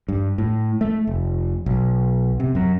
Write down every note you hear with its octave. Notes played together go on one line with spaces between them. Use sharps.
G2
A2
A3
F1
B1
C3
F#2